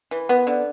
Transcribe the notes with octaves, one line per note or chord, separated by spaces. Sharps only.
E3
B3
D3